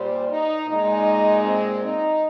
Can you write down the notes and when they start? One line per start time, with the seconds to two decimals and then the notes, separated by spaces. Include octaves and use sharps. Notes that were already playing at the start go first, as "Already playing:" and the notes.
Already playing: A#2 G3 C5
0.29 D#4
0.67 A#2 G#3 D#4
1.44 C4
1.83 D#4